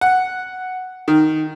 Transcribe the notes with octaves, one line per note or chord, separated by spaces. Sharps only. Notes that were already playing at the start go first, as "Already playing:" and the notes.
F#5
D#3